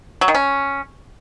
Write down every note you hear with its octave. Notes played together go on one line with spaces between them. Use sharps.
F#3
D#3
C#4